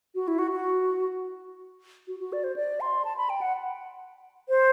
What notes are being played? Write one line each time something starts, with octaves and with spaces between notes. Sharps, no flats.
F#4
E4
F#4
F#4
F#4
F#4
D5
C5
D5
C6
A5
B5
G5
F#5
C5